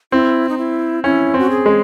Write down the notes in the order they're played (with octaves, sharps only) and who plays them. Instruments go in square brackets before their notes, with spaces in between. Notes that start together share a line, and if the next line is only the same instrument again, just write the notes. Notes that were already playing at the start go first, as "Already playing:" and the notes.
[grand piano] C4 [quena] E4
[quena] D#4
E4
[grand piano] C#4 [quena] E4
[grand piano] C4
[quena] F#4
G#4
[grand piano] G#3